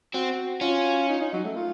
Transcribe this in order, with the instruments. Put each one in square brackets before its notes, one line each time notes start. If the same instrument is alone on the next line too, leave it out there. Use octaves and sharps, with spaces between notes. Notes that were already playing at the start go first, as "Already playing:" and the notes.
[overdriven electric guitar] C4 [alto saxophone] F#4
[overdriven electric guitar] C#4 [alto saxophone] F4
[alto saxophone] D#4
D#4
F#3
A3
F4